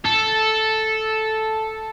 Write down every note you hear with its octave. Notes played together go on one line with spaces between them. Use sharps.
A4